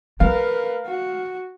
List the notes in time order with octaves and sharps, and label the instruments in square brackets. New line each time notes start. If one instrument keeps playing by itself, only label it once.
[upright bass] A3 [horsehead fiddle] A#4 B4 [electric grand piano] F5
[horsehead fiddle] F#4